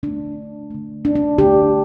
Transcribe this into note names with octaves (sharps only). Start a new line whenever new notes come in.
D3 A3 D4
D3 A3
D4
D4
D3 A3 D4 G4